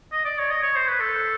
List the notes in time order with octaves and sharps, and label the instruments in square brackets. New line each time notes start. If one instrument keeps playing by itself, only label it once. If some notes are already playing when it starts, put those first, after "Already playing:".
[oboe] D#5
D5
C#5
D#5
C#5
C5
B4
A4